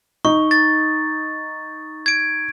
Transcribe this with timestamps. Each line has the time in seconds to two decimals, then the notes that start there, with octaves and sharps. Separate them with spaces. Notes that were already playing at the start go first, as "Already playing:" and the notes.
0.25 D#4 C#6
0.51 A6
2.06 G#6 D7